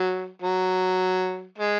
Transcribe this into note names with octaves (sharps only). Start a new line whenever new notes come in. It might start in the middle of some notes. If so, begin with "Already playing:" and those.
Already playing: F#3
F#3
G#3